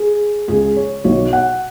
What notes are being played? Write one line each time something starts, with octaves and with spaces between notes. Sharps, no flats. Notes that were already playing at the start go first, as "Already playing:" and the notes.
Already playing: G#4
C#2 C#3 G#4
C#5
B1 B2 C#5
F#5